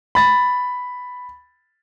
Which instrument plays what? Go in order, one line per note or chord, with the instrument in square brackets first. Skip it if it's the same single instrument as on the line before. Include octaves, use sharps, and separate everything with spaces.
[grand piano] B5 A6